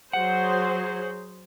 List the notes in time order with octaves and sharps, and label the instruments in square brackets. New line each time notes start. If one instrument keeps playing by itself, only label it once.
[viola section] F#3 G#4 C5 [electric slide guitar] F#5